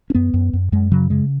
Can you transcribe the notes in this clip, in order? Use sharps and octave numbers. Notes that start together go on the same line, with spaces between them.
C#4
F#2 B3
F#2
F#2
F#2 G#3
C#3 F#3
C#3 G#3